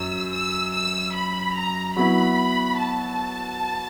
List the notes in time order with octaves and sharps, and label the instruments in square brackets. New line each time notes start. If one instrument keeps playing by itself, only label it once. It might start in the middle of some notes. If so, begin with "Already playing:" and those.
Already playing: [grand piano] F#2 [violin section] E6
[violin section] E6
E6
B5
A#5
[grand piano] F#3 B3 E4 [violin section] B5
[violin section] A5